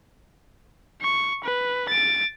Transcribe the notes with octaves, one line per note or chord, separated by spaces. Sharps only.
C#6
B4
A6 D7